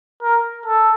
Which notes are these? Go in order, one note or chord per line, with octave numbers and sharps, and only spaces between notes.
A#4
A4